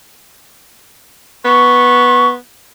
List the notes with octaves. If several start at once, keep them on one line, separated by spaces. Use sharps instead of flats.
B3 C#6